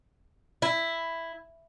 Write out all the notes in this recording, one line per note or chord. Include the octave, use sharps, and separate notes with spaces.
E4